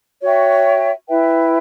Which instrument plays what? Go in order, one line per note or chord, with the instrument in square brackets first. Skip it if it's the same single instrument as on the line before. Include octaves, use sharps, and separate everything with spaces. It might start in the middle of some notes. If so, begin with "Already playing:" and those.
[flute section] F#4 C#5 E5 G5
E4 B4 E5 G5